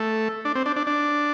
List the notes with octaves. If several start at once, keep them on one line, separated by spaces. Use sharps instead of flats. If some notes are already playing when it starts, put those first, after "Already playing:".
Already playing: A3
D4
C4
D4
D4
D4